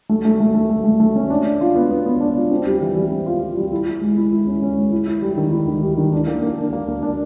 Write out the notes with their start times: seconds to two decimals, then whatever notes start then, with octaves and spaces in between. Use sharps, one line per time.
0.09 A3
0.25 A3
0.40 A3
0.55 A3
0.69 A3
0.84 A3
1.00 A3
1.16 C#4
1.30 D4
1.45 D4
1.61 F4
1.75 B3
1.91 B3
2.06 B3
2.21 D4
2.36 F4
2.51 C4
2.66 G3
2.81 E3
2.95 G3
3.12 C4
3.26 F4
3.41 F4
3.56 G3
3.72 E4
3.87 E4
4.01 G#3
4.17 E4
4.32 E4
4.47 C#4
4.62 C#4
4.77 G#3
4.92 E4
5.07 E4
5.22 G3
5.37 D#3
5.52 E4
5.67 D#3
5.83 G3
5.97 D#3
6.13 D4
6.27 A#3
6.43 A#3
6.58 D4
6.73 A#3
6.88 A#3
7.03 D4